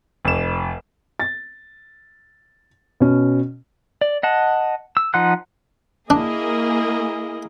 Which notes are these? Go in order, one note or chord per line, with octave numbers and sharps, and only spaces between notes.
F1 E7
A6
B2 C#4
D5
D#5 F#5 A5
E6
F3 D#4 F#5 C6 F#6
A#3 D4 E4 G#4 D#5